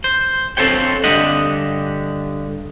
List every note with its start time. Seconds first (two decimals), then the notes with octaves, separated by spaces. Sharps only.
0.04 C5
0.57 C4 A4 C5 C#5 G5
1.04 G2 D3 G4 D#5 F#5